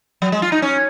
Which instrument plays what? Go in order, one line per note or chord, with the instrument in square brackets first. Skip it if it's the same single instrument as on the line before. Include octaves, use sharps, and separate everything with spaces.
[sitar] F#3
G#3
F4
D#4
C#4